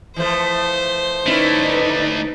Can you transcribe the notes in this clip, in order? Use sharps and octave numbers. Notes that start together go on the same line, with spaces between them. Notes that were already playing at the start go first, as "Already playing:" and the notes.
E3 F3 A3 C5
D2 A3 C#4 D#4 E4 B4 D5